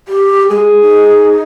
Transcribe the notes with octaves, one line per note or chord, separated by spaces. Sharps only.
G4
G#3 G#4
D#4